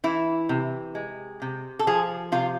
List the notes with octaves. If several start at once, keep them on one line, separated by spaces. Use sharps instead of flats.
E3 E4
C3
G#3
C3
A4
F3 G#4
C3 F4